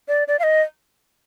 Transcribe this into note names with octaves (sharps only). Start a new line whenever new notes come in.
D5
D5
F5
D#5